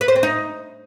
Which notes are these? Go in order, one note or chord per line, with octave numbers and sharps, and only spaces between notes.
B4
C5
C4
D#4